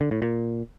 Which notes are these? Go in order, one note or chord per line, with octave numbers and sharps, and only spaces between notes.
D3
A2
A#2